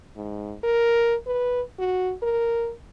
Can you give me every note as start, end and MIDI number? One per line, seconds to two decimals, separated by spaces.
0.16 0.54 44
0.64 1.15 70
1.27 1.61 71
1.79 2.13 66
2.22 2.72 70